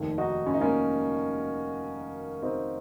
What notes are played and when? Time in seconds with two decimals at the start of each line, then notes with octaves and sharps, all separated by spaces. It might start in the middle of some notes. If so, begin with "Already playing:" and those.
Already playing: F1 D#2 D#3
0.18 D#4 F#4
0.46 C#4
0.54 D#4
0.61 A#3 C#4
2.42 C4 D#4